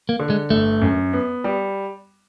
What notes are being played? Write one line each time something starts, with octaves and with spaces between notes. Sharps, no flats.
A#3
D3
G#3
G1 A3
F#2
B3
G3